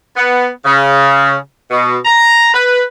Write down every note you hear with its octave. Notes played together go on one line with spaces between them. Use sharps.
B3
C#3
B2
A#5
B4